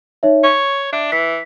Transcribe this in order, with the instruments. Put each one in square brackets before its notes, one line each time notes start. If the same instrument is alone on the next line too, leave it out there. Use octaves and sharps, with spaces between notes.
[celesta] D#4 C#5 E5
[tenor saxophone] C#5 [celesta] C#6
[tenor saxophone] D4 [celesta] E5
[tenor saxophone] E3 [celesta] B6